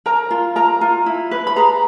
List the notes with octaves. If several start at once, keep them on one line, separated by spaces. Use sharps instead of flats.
A#4 A#5
F4
A#4 A#5
F4
E4
B4
B5
G#4 A#5